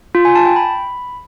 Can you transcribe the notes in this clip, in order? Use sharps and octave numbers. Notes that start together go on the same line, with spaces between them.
F4
G#5
A5
G5
B5